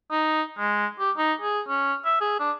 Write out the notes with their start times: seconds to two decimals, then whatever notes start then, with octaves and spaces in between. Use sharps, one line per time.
0.12 D#4
0.59 G#3
0.99 G4
1.18 D#4
1.41 G#4
1.68 C#4
2.05 E5
2.21 G#4
2.40 D4